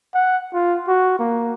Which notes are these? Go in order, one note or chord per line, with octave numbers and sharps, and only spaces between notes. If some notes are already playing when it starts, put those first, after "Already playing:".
F#5
F4
F#4
A#3